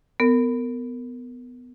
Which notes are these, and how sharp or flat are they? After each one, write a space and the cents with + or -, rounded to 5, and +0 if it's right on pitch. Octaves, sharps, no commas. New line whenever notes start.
B3 +15 A#4 -25